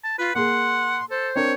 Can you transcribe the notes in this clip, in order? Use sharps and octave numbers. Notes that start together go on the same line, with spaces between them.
A5
F4 B4
A#3 G#4 F#5 C6
A4 C5
C4 D4 A#4 C#5